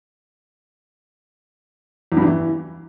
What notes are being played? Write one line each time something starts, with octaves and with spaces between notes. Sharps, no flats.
E2
G2
E2
E3